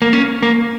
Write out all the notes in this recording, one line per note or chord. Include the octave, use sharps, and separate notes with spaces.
A#3
C#4
A#3